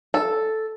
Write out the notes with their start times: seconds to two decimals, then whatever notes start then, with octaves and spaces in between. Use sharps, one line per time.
0.14 A4